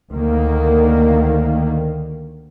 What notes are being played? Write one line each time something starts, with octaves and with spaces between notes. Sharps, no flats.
D2 D#3 A#3